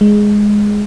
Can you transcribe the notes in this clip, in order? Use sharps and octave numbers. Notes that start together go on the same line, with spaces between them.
G#3